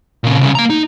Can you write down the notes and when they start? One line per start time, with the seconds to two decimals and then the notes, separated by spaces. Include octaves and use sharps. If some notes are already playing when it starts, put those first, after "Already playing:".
0.24 A#2 C#3
0.40 C2 C#3
0.55 A#3 A#5
0.70 D#4